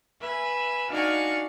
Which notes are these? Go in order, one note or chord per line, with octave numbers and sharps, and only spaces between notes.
B4 E5 G#5
D4 D#4 F#4 F5 G#5 C#6